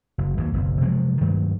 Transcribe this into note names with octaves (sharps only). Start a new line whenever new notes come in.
F#1
G#1 D#2 G#2
F#1 B1
C3 F3 F#3 G#3
G2 D#3 F#3 A3